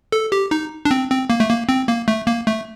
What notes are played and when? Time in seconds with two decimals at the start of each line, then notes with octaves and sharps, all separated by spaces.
0.12 A4
0.32 G4
0.51 D#4
0.85 D4
0.91 C4
1.10 C4
1.30 A#3
1.40 A3
1.49 A#3
1.69 C4
1.88 A#3
2.08 A3
2.27 A#3
2.47 A3